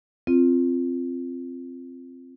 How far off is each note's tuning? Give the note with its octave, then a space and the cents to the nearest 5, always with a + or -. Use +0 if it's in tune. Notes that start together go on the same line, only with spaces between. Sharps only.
C4 +0 F4 -10